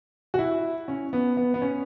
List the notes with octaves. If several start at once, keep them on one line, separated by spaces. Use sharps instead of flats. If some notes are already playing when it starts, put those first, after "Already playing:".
F#4
E4
C#4
B3
B3
B3
C#4